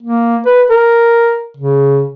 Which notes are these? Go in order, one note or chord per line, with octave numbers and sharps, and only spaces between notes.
A#3
B4
A#4
C#3